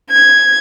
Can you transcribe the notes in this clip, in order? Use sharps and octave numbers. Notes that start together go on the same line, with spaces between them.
G#6